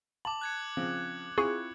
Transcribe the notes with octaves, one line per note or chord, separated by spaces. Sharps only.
A5 D6 F#7
F#6 G#6 C#7
C#3 F3 C4
C4 E4 F4 G#4 C#6